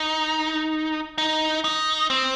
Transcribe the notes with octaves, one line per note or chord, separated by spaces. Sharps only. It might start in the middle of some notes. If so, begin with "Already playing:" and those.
Already playing: D#4
D#4
D#4
C4